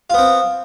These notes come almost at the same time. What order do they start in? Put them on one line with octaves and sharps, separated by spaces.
F4 B3 C4